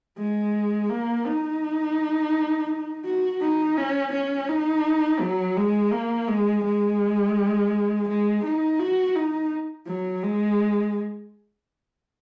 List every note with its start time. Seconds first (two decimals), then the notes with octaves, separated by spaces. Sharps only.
0.18 G#3
0.90 A#3
1.26 D#4
3.05 F#4
3.41 D#4
3.77 C#4
4.13 C#4
4.48 D#4
5.20 F#3
5.56 G#3
5.92 A#3
6.28 G#3
6.64 G#3
8.08 G#3
8.44 D#4
8.79 F#4
9.15 D#4
9.87 F#3
10.23 G#3